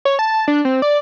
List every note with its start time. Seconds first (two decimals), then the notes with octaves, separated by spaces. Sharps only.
0.05 C#5
0.19 A5
0.48 D4
0.65 C4
0.82 D5